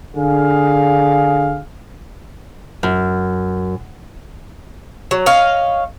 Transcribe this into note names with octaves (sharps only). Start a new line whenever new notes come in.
D3 G#4 F5
F#2
F#3
C#5 D#5 F5